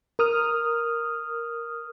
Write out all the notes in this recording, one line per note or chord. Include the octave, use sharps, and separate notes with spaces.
A#4 D#6 F6